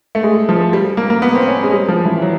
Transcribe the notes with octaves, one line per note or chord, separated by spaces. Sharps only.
A3
G#3
F3
G3
A#3
A#3
B3
C4
C#4
G#3
G3
F3
E3
F#3